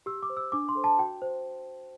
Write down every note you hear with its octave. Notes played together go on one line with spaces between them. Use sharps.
G4 E6
D6
C5
E6
D4 D6
C6
A4 C5
A5
F#4 G5
C5